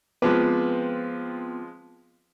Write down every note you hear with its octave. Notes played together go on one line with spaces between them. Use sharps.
F3 G#3 B3 C4 F4 B4 D6